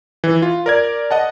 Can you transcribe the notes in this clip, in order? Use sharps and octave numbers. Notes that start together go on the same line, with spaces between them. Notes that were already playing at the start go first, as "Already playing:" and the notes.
E3
F4
A#4 D5 G#6
D#5 F#5 A5